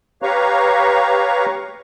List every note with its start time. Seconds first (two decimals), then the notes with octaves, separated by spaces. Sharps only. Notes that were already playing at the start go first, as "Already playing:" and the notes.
0.22 G4 B4 C#5 F5 A#5 C#6